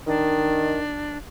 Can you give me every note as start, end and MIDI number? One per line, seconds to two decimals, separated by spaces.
0.07 0.81 51
0.07 1.17 62